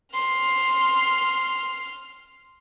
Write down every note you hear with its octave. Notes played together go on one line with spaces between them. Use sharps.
C6 F6